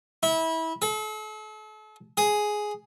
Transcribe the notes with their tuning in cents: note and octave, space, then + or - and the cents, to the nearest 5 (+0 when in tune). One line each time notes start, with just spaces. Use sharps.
E4 -25
A4 -40
G#4 +5